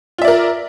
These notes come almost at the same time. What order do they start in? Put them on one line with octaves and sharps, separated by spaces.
F4 E5 D5 A#4